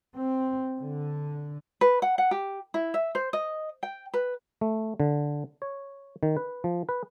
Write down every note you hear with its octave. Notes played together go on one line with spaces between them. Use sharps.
C4
D3
B4
F#5
F#5
G4
E4
E5
C5
D#5
G5
B4
A3
D3
C#5
D#3
B4
F3
B4